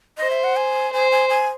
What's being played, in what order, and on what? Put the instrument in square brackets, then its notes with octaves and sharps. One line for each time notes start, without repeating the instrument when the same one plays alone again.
[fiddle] C5 [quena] D#5
[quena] E5
F#5
G#5
[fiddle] C5 [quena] G#5
[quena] G#5
G#5